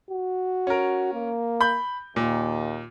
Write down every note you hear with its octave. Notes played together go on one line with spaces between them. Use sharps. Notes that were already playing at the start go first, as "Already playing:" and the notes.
F#4
C#4 A#4
A#3
B5 G6
D#2 A#2